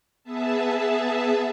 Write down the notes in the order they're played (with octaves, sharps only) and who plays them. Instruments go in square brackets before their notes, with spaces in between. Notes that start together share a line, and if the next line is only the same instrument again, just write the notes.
[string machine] B3 G#4 E5 A5